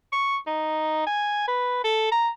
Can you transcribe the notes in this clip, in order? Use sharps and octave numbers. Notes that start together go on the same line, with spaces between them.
C#6
D#4
G#5
B4
A4
A#5